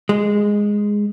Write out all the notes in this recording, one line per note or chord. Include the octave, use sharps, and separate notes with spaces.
G#3